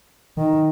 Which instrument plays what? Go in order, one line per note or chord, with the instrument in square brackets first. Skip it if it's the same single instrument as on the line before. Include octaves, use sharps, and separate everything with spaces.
[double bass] D#3